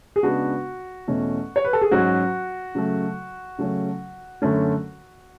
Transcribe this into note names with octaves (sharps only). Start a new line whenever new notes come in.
G#4
C#3 G#3 B3 D4 F#4
E2 B2 A3 C#4
C#5
B4
A4
G#4
G#2 F#3 C#4 F#4
C#3 F#3 A3
C#3 F#3 A3 C#4
F#2 D3 A3 C#4